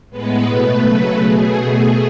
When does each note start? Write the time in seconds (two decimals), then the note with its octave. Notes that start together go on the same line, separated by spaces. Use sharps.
0.10 A2 G#3 B3 B4
0.46 B2 A3
0.82 C#3 F#3 A3
1.17 B2 A3 G#4